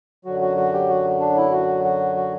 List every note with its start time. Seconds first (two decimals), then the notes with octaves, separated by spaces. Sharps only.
0.25 F#2 D3 F#3 F#4
0.40 F#4
0.57 F#4
0.73 G4
0.89 F#4
1.20 D4
1.36 E4
1.52 F#4
1.84 F#4
2.16 F#4